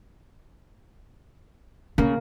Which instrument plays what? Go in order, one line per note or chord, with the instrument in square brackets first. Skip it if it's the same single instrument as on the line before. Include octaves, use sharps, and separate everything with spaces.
[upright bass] C#3 [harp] A#3